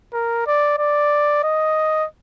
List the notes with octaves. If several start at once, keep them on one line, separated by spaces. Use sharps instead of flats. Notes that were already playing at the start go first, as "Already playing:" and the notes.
A#4
D5
D5
D#5